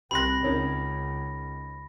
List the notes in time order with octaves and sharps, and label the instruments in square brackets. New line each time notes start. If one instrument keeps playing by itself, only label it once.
[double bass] C2 C4 [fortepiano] G4 C6 F#6 [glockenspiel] B5 A#6
[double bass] C#2 [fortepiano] C#4 D#4 A#4